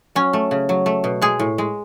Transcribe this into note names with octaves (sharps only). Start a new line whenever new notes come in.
F#3 C#4
A3
C#3
F#3
A3
B2
G#3 G#4
A2
G#3